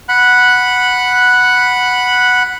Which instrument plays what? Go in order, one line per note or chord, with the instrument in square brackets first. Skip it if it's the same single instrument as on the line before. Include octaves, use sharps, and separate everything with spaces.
[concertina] F#5 B5 F#6